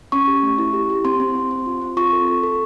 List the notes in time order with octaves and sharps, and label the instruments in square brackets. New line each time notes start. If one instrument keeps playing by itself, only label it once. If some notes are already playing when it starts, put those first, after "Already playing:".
[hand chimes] C#4 C#6
G4
A3
E4
G4
G4
C4 C6
C4
C4
C4
F4
C4
F4 C#6
A4
A4
A4